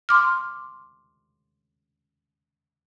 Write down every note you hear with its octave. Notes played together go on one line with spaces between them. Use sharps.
C6 D6 F6